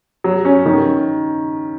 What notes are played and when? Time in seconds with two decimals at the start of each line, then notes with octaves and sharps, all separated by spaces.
0.24 F#3
0.45 C#4
0.66 D#3